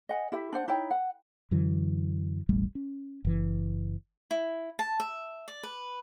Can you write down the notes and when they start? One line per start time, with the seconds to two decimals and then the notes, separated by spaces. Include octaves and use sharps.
0.09 D#5 F#5 G#5
0.32 E4 G4 E5
0.53 D4 C5 F#5
0.68 D#4 E4 C#5 G5
0.91 F#5
1.51 F#2 D3 E3 F#3
2.49 E1 A1 G3 A3
2.75 C#4
3.25 F#1 E3
4.31 E4
4.79 A5
5.00 E5
5.48 D5
5.63 B4